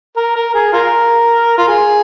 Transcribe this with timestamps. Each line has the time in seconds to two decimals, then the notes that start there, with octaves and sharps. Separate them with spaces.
0.17 A#4
0.36 A#4
0.54 G#4
0.73 F4 A#4
1.58 F4
1.68 G#4